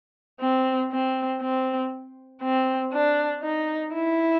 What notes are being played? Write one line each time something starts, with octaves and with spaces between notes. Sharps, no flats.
C4
C4
C4
C4
D4
D#4
E4